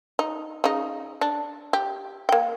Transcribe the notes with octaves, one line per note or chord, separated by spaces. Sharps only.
D#4
C#3 D#4
D4
G4
A#3 G5